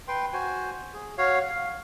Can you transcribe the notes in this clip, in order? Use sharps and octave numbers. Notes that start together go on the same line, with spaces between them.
B4 G5 C6
F#4 C5 G#5
G#4
F#4 C#5 F5
F5